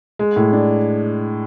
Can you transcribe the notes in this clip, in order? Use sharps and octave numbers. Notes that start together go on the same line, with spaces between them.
G#3
A2
D4